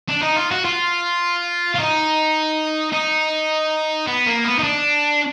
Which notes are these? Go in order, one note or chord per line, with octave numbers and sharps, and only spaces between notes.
D4
D#4
F4
F#4
F4
F4
D#4
D#4
B3
A#3
B3
D#4
D4